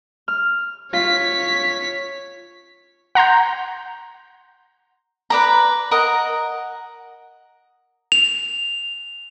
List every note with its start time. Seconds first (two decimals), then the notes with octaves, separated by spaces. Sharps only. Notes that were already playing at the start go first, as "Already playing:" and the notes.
0.28 F6
0.93 F4 C#5 B6
3.15 F#5 A#5 C6 G6
5.30 B4 D5 A#5
5.91 A#4 D#5 F#5 A#5
8.12 F7